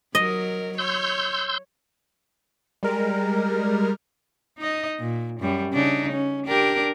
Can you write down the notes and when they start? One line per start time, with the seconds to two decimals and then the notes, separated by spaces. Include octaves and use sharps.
0.15 F#3 A#4 D#5
0.78 C#5 C6 E6 G6
2.83 G3 G#3 A#4
4.59 D#4 D#5
5.00 A#2
5.40 F#2 G3
5.73 C#3 D4 D#4
6.12 C#4
6.46 D4 G4 A#4